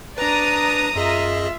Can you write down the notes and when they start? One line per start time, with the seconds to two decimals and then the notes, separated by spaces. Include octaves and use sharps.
0.18 D4 B4 D5 A#5 D#6
0.96 F#2 F4 G#4 D#5 E5